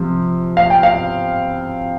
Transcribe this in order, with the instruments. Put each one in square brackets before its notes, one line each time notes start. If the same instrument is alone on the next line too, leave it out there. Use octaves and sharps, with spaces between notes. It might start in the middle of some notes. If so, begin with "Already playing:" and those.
Already playing: [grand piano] C3 F3
F5
G5
F5